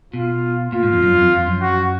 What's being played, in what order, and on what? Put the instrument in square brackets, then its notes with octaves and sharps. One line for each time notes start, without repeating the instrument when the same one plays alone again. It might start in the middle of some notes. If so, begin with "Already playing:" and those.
[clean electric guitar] B2 [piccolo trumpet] F4
[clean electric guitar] A#2 [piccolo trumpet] F4
[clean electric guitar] G#2
F2
F#2
F2
F2
F#2
[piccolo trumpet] F#4